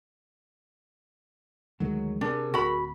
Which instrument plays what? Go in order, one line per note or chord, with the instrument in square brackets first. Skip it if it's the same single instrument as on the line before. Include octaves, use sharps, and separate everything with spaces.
[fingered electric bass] D2 D#3 G#3 [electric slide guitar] F#3
[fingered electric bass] C3 [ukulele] D4 [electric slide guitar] G#4 A#4
[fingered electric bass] D1 [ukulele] F#4 B5